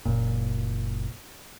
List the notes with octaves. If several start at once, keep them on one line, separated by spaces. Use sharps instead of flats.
F#1 A#2